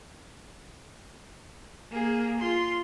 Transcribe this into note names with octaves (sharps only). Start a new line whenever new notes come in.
A#3 G#4
F4 C6